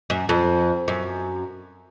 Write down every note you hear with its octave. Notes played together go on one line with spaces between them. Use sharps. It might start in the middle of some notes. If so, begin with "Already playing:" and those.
F#2
F2
F#2